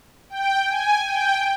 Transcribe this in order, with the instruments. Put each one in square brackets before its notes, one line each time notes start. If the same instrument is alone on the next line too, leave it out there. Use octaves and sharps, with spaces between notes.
[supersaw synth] G5
G#5
G5